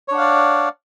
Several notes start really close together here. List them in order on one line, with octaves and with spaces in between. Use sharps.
C#5 D4 F#5 F5 D5